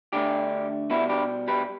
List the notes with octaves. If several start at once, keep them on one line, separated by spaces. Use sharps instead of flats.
D3 A3 D4 G4
B2 G3 B3 E4
D4 G4
G4 B4